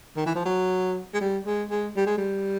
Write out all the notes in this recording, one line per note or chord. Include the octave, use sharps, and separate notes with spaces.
D#3
E3
F3
F#3
G#3
G3
G#3
G#3
G3
G#3
G3